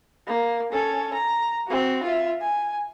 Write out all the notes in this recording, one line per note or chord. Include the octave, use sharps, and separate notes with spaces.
A#3
C#4 A4
A#5
C4 F#4
F4 E5
G#5